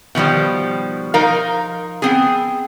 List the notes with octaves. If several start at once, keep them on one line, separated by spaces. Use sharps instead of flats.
B2 D#3 F3 G3
F3 D#4 A#4 F5
B3 C4 G#4